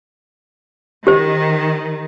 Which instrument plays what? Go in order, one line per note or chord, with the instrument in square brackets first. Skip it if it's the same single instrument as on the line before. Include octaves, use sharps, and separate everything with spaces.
[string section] D#3 [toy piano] G4 C5